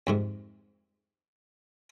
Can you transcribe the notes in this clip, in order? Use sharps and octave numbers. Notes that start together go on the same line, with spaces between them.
F2 G#2 C3